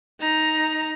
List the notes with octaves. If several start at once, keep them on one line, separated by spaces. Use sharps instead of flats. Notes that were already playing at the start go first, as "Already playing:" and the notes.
D#4 A#5